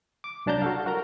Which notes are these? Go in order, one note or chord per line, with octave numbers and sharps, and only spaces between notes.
D6
C2 F#3 D4 A5 A#5 G6
F#4 A4 F5
F#4 A#4 A#5